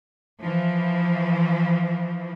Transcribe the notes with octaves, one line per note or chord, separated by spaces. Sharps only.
E3 F3